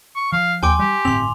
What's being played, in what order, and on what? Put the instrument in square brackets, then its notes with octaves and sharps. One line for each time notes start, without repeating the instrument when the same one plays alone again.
[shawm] C#6
[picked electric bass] F3 [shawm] F5
[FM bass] D#2 [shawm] G5 [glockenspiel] G#5 C6 D6
[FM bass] G3 [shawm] G4
[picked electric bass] G1 A2 [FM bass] C4 [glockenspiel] C6 F7